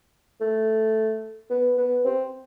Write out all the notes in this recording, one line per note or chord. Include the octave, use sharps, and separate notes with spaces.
A3
B3
B3
C4